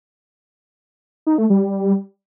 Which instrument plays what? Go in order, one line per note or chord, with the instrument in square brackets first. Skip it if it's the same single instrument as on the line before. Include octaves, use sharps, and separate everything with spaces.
[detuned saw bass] D#4
A3
G3